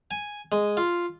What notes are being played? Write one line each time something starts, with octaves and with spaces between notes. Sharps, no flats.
G#5
G#3
F4